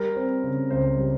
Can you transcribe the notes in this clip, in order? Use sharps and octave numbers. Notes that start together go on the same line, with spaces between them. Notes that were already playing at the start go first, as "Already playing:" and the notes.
Already playing: G3 A#4
C4
C#3
C#2 C5
G3